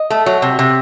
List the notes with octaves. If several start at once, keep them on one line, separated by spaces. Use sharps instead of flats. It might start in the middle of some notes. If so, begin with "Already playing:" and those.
Already playing: D#5
A3
F#3
C3
C3